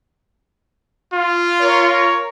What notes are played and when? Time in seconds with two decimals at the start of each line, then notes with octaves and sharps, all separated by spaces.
1.14 F4
1.60 A#4 C#5